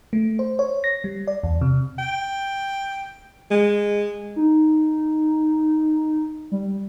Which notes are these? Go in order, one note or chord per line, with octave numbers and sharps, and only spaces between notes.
A3
C5
C#5
A#6
G3
D5
E2
C3
G5
G#3
D#4
G3